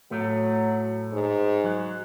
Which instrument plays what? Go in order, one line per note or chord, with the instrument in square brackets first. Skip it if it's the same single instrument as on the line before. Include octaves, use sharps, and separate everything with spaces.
[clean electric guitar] A2 A3 [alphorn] F#3
[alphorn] G#2
[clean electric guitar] F#3